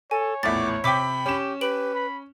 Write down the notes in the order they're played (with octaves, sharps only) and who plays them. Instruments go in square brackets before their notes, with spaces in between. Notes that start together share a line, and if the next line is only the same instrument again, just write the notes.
[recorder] A4 [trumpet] C#5 [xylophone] G#5
[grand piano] A#1 E2 A2 [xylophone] E5 A6 [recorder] D6
[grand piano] C3 G5 [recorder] B5 [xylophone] D6 B6
[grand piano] C#4 E7 [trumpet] G4
[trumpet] G4 [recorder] B4 [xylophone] D7 F#7
[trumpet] B5